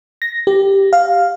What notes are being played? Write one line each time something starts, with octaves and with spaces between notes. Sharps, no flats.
A#6
G4
F5